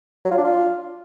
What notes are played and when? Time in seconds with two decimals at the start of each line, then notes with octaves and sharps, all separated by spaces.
0.25 F#3
0.31 F4
0.38 D4
0.44 F4